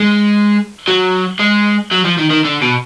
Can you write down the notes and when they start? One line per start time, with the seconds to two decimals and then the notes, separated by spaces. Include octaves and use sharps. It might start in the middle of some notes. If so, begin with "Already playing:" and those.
Already playing: G#3
0.88 F#3
1.39 G#3
1.92 F#3
2.05 F3
2.19 D#3
2.31 D#3
2.45 D3
2.62 B2